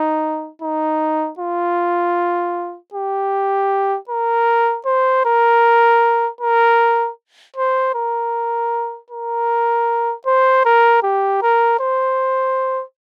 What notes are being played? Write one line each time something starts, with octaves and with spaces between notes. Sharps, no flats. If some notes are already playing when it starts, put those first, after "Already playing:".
Already playing: D#4
D#4
F4
G4
A#4
C5
A#4
A#4
C5
A#4
A#4
C5
A#4
G4
A#4
C5